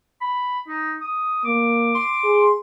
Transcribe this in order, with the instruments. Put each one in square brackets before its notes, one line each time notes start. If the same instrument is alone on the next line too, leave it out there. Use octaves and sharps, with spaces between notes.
[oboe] B5
D#4
D#6
[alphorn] A#3 [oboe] D6
[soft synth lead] C6
[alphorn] G#4